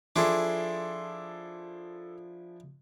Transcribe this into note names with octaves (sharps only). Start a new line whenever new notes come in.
F3 D4 E4 G#4 A4 C6 D6